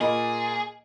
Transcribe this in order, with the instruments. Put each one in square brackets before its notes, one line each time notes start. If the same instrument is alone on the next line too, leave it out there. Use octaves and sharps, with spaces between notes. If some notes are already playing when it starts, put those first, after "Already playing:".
[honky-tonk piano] A#2 A#3 [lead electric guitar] G#4 [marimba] D#5 B5